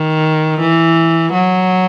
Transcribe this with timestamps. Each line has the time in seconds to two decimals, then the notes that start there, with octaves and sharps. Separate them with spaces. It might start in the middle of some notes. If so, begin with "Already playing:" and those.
Already playing: D#3
0.60 E3
1.33 F#3